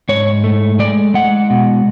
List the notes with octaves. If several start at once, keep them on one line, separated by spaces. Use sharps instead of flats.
G#2 C#5
A3
G#3 D5
G#3 F#5
B2